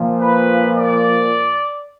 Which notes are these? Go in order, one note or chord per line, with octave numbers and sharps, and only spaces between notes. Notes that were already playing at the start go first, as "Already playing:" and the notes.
Already playing: A#2 F3
B4
D5